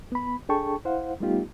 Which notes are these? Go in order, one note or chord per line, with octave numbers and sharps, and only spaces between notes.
B3 B5
D4 G#4 A4 G5 A5 C#6
E4 C5 F5 F#5
G3 A3 B3 D#4 F4 G4